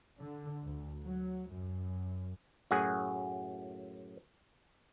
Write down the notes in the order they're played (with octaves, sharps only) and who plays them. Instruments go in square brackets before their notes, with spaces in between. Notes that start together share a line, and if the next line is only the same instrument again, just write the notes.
[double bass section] D3
D2
F#3
F#2
[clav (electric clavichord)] F#2 A2 F#4 G#4